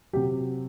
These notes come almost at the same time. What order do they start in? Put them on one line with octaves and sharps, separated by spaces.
F#3 G4 C3